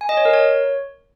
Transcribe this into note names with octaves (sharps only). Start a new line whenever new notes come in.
G#5
D#5
C#5
A#4
C#5